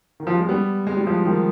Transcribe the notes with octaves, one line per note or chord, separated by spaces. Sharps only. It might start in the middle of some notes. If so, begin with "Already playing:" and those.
D#3
F3
G3
G#3
G3 B3
G#3
G3
F3 G#3
D#3 G3